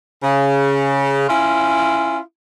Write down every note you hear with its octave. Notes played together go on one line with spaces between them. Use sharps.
C#3
C#4 E4 F4